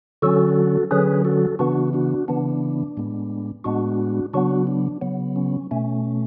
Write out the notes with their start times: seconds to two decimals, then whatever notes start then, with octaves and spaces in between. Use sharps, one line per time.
0.22 D3 F#3 C#4 F#4 A4
0.91 D3 F#3 C#4 G#4 B4
1.25 F#4 A4
1.59 C#3 E3 B3 D4 F#4
1.93 D4 F#4
2.28 C#3 E3 B3 D4
2.97 A2 G#3 B3
3.64 A2 G#3 B3 D4 F#4
4.33 C#3 F#3 B3 D4 F#4
4.67 D4
5.01 C#3 F#3 B3
5.36 C#4
5.71 B2 A3 C#4